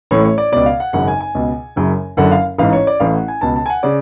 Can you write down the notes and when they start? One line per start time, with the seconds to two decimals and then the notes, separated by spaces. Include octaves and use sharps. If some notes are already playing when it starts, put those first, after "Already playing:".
0.11 A1 A2 C#5
0.25 C#5
0.38 D5
0.52 C#2 B2 D5
0.66 F5
0.80 F#5
0.93 G#1 F#2 C#3 F#5
1.08 G#5
1.21 G#5
1.35 C#2 B2
1.76 F#1 F#2 C#3
2.17 F#1 F#2 D3 F#5
2.31 F5
2.58 A1 G#2 F5
2.73 C#5
2.87 D5
3.00 A1 A2 F5
3.14 F#5
3.28 G#5
3.41 C#2 B2 A5
3.56 A5
3.66 G#5
3.70 F#5
3.83 C#3 D5